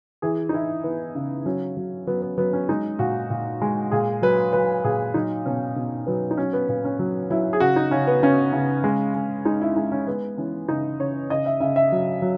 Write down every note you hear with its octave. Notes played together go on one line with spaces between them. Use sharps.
E3 G#4
D#4
E3 E4
E3 B3
C#3
F#3 C#4
F#3
F#3 B3
B3
F#3 B3
C#4
G#3 D#4
A#2 F#4
A#2
G#3
A#2 G#4
F#3 B4
F#3 B4
A#2 G#4
F#3 D#4
B2 C#4
B2 C#4
F#3 B3
D#4
F#3 C#4
B3
A#2 B3
C#4
F#3
F#3 E4
G#4
C#3 F#4
D#4
C#3 C#4
B3
C#3 C#4
C#3
G#3
G#3
G#3 D#4
E4
G#3 D#4
C#4
G#3 B3
E3 C#4
C#3 D#4
C#3 C#5
C#3 D#5
E5
C#3 E5
E5
F#3
F#3